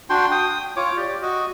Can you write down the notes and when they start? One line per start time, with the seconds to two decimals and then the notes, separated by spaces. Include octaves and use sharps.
0.10 D4 F#4 G5 C6
0.31 G5 D#6
0.76 F4 C#5 D6
0.97 G4 D5
1.22 F#4 D#5